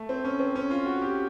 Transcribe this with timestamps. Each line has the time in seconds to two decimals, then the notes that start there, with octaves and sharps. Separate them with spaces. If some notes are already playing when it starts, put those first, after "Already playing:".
Already playing: A3
0.09 C4
0.25 C#4
0.40 C4
0.55 C#4
0.71 F4
0.86 F#4
1.02 G4